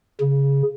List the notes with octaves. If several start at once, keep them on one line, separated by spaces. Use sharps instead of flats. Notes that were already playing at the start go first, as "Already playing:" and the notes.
C#3